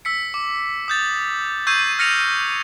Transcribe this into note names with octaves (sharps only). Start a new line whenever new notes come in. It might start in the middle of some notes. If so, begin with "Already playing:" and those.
E6 B6 C#7
D6
D#6 G6 A6
C#6 E6 G6 G#6 C7 D#7
F6 A#6 C#7 D#7 F7